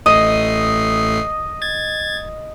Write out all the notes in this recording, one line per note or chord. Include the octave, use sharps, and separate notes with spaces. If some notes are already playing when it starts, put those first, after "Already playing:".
A1 A3 D#5 C7
G#6 A6